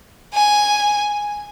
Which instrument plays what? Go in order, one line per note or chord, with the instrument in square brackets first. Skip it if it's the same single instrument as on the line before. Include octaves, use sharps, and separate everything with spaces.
[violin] G#5